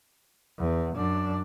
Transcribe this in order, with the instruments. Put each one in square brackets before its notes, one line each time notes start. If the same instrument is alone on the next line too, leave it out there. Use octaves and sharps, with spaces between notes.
[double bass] E2
F#2 D4